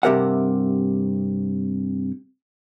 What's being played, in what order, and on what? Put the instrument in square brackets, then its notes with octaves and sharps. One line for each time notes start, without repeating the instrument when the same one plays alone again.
[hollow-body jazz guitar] G2 C3 G4 A#4 E5 F#5